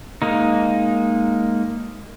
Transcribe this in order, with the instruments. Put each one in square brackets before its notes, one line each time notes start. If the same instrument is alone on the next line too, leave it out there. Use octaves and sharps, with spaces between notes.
[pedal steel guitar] G#3 A#3 D#4